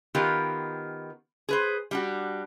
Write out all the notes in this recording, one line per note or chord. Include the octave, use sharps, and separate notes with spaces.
D#3 B3 F4 G4 A#4
G#4 B4 C5
G3 D4 F#4